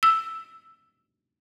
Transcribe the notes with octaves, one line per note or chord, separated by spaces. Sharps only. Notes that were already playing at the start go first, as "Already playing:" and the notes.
E6